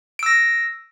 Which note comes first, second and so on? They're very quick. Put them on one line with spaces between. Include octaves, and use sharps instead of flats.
D7 E6 A#6